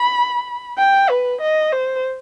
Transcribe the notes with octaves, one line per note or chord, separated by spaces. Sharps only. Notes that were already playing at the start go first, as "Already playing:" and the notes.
Already playing: B5
G5
B4
D#5
C5